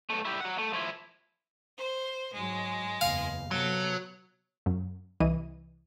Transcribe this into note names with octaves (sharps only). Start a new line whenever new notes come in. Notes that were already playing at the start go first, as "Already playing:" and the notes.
B1 A3
E4 G4
F#3 F#5
A3
F3 E4
C5
G#2 F#3 G#3
F#1 E2 F5
C3 F#3 B3 A4
F#2
C2 E3 D#5 D#7